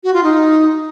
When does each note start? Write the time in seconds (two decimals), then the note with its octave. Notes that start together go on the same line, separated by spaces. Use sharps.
0.04 F#4
0.14 F4
0.24 D#4